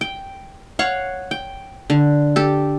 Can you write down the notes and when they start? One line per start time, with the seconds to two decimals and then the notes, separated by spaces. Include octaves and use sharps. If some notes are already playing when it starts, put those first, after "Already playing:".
0.01 G5
0.79 C#5 F5 F#5 C#6
1.31 G5
1.90 D3
2.36 G4 A4